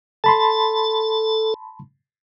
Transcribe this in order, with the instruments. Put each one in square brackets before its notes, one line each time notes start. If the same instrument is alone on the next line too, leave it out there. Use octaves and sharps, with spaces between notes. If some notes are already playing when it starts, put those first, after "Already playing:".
[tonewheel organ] A4 [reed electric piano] A5 B5 C6